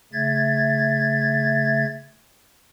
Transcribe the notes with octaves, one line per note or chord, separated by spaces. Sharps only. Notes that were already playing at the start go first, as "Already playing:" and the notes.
C#3 A3 E5 G#6 A6